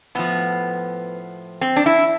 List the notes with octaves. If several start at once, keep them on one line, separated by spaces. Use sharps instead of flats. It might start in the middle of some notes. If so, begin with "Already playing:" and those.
A2 F3 B3
C4
D4
E4